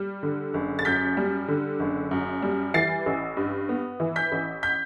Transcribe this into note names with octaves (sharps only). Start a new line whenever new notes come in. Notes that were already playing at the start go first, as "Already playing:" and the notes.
Already playing: G3
D3
F#1
A6
F#2 G6 B6
G3
D3
F#1
F#2
G3
E3 A6 C7
A1
G2
B3
E3
G6 B6
A1
G6 B6